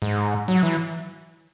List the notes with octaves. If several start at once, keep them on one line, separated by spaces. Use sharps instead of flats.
G#2
F#3
E3